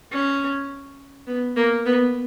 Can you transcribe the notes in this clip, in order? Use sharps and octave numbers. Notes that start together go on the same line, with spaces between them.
C#4
B3
A#3
B3